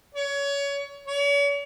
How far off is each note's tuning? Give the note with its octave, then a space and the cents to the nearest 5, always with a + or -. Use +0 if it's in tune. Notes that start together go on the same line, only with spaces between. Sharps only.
C#5 +25
C#5 +40